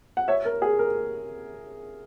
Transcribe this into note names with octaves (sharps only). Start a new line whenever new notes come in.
F#5
C#5 E5
A#4
G#4
A#4